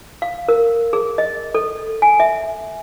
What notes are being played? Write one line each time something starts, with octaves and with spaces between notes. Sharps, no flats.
F5
A#4
G#4
D#5
A4
G#5
E5